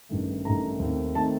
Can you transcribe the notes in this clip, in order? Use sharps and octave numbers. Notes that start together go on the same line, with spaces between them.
A1 G2 D#3 A3
A1 G2 D#3 A3 A#5
D#2 D#3 A3 C4
D#3 A3 C4 A5